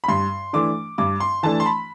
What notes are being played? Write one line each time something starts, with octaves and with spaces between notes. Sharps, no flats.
B5
G2 C6
E3 A3 D4 D6
G2 D6
C6
E3 A3 D4 A5
C6
B5